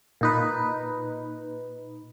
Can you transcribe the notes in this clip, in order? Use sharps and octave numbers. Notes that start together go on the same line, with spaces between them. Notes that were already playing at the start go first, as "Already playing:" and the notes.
A#2 D#4 B4